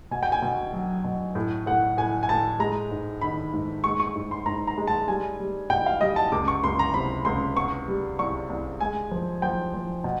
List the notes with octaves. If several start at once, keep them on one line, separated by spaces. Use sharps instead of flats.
B2 G#5
G5
G#5
B2
F#3
B2
A2
A2 F#5
A2 G#5
G#5
A2 A5
G#3 A#5
G#2
D#3 B5
G#2
G#3 C#6
C#6
G#2
C6
G#2 A#5
A#5
G#3
A5
G3 G#5
G3
B2 G5
F5
G3 D#5
A5
C#2 D6
C#6
C#2 C6
A#5
C3 B5
C#2 C6
B3 C#6
G3
C2 C#6
C2
G#3 G#5
F3
F3 G5
F3
B2